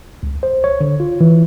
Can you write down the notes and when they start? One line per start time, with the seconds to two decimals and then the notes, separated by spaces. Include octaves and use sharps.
0.23 C#2
0.43 C5
0.64 C#5
0.80 D3
1.00 F4
1.21 E3